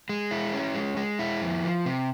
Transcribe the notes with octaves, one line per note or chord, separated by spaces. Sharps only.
G#3
E4
C#4
G#3
G#3
E4
F2
F3
C3